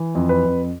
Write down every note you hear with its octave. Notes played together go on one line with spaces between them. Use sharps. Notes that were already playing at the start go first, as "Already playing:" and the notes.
Already playing: E3
F2
B4
F2